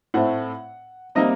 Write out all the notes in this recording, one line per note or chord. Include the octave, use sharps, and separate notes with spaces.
A2 A3 C4 F#5
C3 G3 A#3 D#5